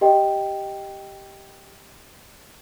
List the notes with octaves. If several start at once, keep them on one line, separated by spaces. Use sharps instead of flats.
G4 D#5 G5